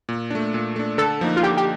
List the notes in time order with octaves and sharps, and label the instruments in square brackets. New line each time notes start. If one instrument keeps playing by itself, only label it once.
[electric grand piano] A#2
A3 D4
A#2
A3 D4
[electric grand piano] D3 [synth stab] A4
[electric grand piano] F3 A#3 D#4
[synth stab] F4
[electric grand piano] D3 [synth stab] G4
[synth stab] G4